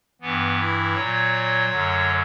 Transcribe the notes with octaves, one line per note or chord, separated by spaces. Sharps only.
G2 E3 B3
E4
A#2 F#3 C#5
F#2 D3 F#3